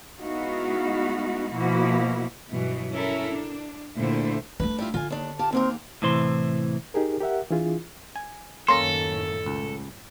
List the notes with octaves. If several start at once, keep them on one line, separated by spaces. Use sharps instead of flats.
G#3 B3 D#4 E4 F#4 F5
B2 F3 A#3 E4 F#4
G2 B2 E3 F#3
C#4 E4 A4 A#4
D4
D2 A#2 D3 A3 E4 C5
A3 D4 B4
G3 E4 F4
D3 F4 G#5
D#2 D4
F4 G4 A5
D#2 A#3 C4 A#4
A2 C3 E3 C5 C6
D#4 G4 G#4 A#4
G4 A#4 E5 F#5
E3 D4 E4 F4 G#4
G#5
F#2 A2 D#3 A#3 C#4 A4 A#5 C6
C#2